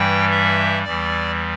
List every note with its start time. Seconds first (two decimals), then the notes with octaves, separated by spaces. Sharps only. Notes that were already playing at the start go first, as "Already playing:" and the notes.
Already playing: G2 E3 G3 G5
0.31 E5
0.84 E2 E3 G3 D5